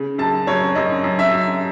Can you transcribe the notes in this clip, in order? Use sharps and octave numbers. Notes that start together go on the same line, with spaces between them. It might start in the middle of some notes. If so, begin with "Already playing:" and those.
Already playing: C#3
F#2 A5
F#2 C#5
F#2 D#5
F#2
E5
F#2